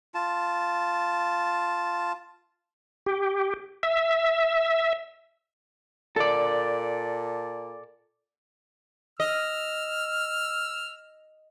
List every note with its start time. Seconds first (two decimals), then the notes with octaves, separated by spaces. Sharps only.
0.14 F4 A5
3.06 G4
3.83 E5
6.16 A#2 A4 D5
9.20 D#5 E6 F6